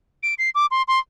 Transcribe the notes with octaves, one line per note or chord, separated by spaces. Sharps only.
D7
C7
D6
C6
C6